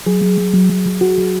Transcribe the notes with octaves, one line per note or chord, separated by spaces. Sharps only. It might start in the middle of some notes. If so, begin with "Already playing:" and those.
F#3 G#4
F#3
F#3
F#3
F#3
F#3
F#3 F#4
F#3